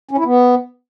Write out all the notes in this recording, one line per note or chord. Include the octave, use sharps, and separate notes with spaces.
C#4
E4
B3